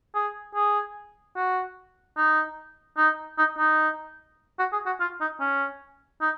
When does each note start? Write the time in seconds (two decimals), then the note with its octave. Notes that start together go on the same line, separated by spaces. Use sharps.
0.15 G#4
0.55 G#4
1.36 F#4
2.17 D#4
2.97 D#4
3.38 D#4
3.58 D#4
4.59 F#4
4.73 G#4
4.86 F#4
5.00 F4
5.21 D#4
5.40 C#4
6.21 D#4